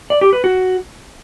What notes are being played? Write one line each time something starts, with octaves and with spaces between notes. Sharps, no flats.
D5
G4
B4
F#4